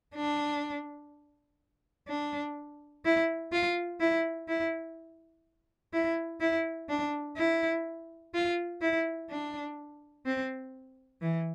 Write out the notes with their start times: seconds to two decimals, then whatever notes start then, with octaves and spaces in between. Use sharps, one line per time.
0.15 D4
2.08 D4
3.05 E4
3.53 F4
4.00 E4
4.48 E4
5.93 E4
6.41 E4
6.89 D4
7.37 E4
8.34 F4
8.82 E4
9.30 D4
10.26 C4
11.22 E3